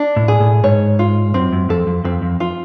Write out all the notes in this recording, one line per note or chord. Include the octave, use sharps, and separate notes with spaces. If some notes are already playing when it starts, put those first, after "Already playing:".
Already playing: D4
A2
G#4
A2
G#2 C#5
F4
F#2 C4
F#2
F2 A4
F2
F2 C4
F2
F4